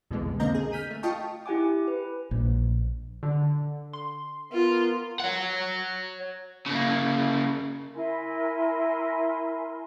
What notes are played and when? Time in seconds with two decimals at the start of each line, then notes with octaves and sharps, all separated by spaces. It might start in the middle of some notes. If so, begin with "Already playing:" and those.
0.11 C2 F2 B2 D3 E3 G#3
0.40 D3 A#3 C4 D#5 A#5 G6
0.55 G#4
0.72 F6 G6 B6 D#7
0.90 A3
1.03 F4 D#5 F5 G5 A5 C#6
1.46 E4 G4 F#5 G#5 D6
1.88 B4
2.31 A#1
3.23 D3
3.93 C6
4.52 B3 F4 A#4
5.20 C#5 F#5
6.66 C#3 A#3
7.95 E4 A#4 G#5 C6